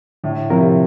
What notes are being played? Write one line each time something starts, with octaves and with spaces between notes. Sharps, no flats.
A2 D3
A2 C3 F3 C4 F4 A#4